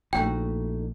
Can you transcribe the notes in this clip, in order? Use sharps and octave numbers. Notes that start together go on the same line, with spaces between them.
A#1 A3 D#4 F#4 G5